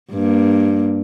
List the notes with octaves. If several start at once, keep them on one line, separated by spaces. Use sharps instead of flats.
G2 A#3